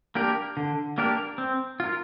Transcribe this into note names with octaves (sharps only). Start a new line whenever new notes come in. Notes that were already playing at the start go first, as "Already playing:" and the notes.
A#3 D4 G4 A#4
D3
A#3 D4 G4 A#4
C4
F4 A#4